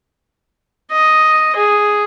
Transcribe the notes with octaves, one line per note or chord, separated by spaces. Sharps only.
D#5
G#4